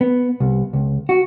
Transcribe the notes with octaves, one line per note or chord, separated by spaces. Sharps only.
B3
C2
C#2
F#4